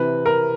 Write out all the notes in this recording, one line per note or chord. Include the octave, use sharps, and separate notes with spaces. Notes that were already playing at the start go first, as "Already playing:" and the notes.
Already playing: C3 E3 B4
A#4